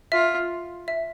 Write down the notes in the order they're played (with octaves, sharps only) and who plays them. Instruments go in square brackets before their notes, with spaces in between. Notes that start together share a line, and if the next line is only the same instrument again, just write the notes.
[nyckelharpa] F4 [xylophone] E5
[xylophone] E5